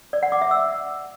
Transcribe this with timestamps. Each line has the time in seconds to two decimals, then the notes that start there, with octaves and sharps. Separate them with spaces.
0.13 D5
0.23 F#5
0.32 D6
0.42 E5
0.51 E6